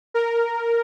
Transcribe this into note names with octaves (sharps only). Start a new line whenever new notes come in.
A#4